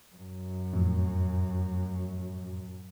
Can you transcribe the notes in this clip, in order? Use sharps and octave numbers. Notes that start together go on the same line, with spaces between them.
F#2
F2 A2